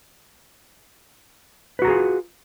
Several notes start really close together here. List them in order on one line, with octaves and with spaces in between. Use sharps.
B4 F#4 A#5 G#4 F4